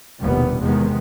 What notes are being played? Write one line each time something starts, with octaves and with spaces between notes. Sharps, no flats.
F1 A#1 D#2 B2 G3 B3
E2 C3 D#3 G#3 B3